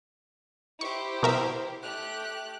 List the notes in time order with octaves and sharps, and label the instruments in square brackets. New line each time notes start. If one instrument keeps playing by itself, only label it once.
[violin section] E4 G4 C5 [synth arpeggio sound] C#6
[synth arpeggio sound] B2 A#4 E5
[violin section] A3 G4 F#6